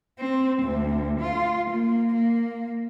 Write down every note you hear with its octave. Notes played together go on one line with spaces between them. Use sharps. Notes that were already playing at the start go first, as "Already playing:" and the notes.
C4
D2
F4
A#3
A#3